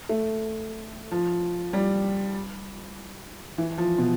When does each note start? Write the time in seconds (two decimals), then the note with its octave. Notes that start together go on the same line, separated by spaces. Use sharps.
0.09 A3
1.12 F3
1.73 G3
3.58 E3
3.78 F3
3.98 B2